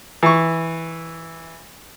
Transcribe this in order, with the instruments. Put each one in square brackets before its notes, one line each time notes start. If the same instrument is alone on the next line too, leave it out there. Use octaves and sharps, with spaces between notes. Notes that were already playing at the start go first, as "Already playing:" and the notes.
[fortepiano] E3 C#6